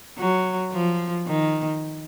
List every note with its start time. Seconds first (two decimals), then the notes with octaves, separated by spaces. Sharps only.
0.18 F#3
0.72 F3
1.27 D#3